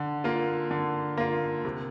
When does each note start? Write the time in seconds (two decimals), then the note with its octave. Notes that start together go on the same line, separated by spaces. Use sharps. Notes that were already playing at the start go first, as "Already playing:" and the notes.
Already playing: D3
0.24 A#3 F4
0.71 D3
1.17 A#3 F4
1.65 C3